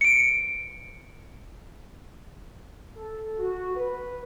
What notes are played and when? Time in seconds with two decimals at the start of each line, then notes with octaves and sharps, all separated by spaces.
0.01 C#7 D7
2.97 A4
3.38 F#4
3.76 B4